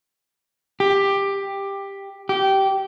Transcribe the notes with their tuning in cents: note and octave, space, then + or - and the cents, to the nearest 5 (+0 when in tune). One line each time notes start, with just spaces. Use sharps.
G4 +10
G4 -15